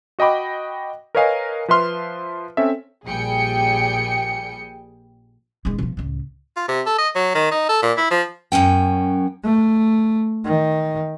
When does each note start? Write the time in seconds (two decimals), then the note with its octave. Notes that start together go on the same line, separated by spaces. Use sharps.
0.19 F#4 D#5 G5 B5 D6
1.15 A#4 B4 C#5 D#5 F5 G#5
1.68 F3 B4 E5 C6 F6
2.57 C4 C#4 A4 E5
3.06 A#1 G3 G#4 G5 C#7
5.65 D#1 G#3
5.79 B2 F3
5.97 C#2 A2
6.56 F4
6.68 C3
6.86 A4
6.98 D#5
7.15 F#3
7.35 D#3
7.51 D#4
7.69 A4
7.82 A#2
7.97 E4
8.11 F3
8.52 F#2 F#3 C#4 G5
9.44 A3
10.45 D#3